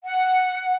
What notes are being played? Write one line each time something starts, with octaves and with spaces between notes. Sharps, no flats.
F#5